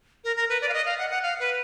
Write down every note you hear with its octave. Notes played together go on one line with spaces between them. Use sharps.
A#4
A#4
B4
D5
F5
D#5
F5
F#5
F#5
F5
B4